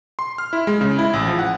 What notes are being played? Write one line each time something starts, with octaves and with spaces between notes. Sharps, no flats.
C6
F6
E4
G#3
C#3
E4
A1
F3
F#5